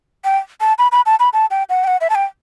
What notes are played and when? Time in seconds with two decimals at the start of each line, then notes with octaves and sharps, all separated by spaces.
0.24 G5
0.61 A5
0.79 B5
0.92 B5
1.06 A5
1.20 B5
1.33 A5
1.51 G5
1.69 F#5
1.84 G5
1.87 F#5
2.01 E5
2.10 A5
2.15 G5